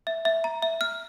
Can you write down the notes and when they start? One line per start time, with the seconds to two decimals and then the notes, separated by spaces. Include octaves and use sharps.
0.07 E5
0.25 E5
0.44 A#5
0.62 E5
0.81 F6